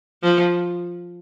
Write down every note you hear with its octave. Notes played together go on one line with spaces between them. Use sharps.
F3